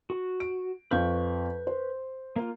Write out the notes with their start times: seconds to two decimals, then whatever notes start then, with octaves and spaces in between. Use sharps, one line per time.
0.10 F#4
0.40 D7
0.91 F2 B4 F5 C#6 G6
1.67 C5
2.36 A#3 F4